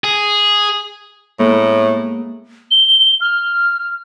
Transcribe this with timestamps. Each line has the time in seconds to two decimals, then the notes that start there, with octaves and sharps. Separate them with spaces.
0.04 G#4
1.39 A2 G#3 A#3 B3
2.71 G7
3.21 F6